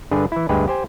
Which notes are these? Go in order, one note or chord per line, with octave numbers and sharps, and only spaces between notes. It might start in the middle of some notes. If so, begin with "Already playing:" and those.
G2 D3 D4 G#4 B4
E3 E4
D2 G2 G#3 G4 G#4 B4
G4 C5 G#5